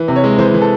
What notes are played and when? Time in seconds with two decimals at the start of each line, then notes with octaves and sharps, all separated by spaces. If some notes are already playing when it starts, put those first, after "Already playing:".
Already playing: E3
0.08 C3
0.16 C#5
0.24 G#3
0.38 E3 C5
0.54 E3
0.61 A4